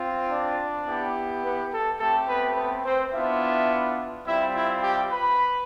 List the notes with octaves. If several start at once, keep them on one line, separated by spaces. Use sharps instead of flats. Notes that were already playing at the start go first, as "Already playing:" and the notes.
Already playing: C4 F4
D4 D5
B3 E4 G4
B3 B4
A4
A3 C4 G4 A4
B3 B4
B3 B4
C4 C5
B3 D4 E4 F4 E5
G3 C4 E4 F4 E5
E4 E5
G4 G5
B4 B5